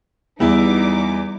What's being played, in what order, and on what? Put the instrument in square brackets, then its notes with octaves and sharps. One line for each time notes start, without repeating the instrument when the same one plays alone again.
[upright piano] E2 B3 E4 [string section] G3 D#4 D6